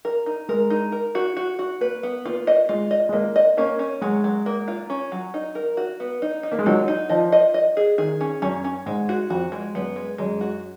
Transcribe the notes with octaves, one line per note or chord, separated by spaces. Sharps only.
A#4
D#4
G#3 A#4
D#4
A#4
F#4
F#4
F#4
A#3 B4
B3
A#3 F4
D#5
G#3 F4
D#5
G#3
A#3 D#5
D#5
A#3 C#4
C#4
F#3 G#3
F#3
A#3
F4
C#4
F#3
D#4
A#4
F#4
B3
D#4
D#4
A#3
G#3
F#3 D#4
D#4
F3 D#5
D#5
D#5
G#4
D#3 G#4
C#4
F#2 C#4
C#4
G#2 G#3
F#4
F2 F#4
G#3
F#2 B3
G#3
F#2 G#3
F#4